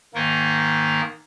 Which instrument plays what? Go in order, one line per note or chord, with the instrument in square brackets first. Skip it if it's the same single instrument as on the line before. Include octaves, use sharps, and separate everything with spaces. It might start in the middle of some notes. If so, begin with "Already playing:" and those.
[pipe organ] G#2 D#3 A#3 D#4 A#4